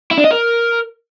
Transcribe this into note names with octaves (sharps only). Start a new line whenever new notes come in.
E4
D4
D#5
A#4